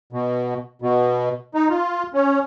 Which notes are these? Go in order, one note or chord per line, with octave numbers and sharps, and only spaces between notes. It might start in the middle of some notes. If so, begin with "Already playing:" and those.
B2
B2
D#4
F4
C#4